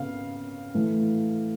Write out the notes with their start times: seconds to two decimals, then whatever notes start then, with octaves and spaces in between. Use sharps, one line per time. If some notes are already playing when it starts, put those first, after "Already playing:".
Already playing: C#3 B3 F5
0.74 A2 E3 A3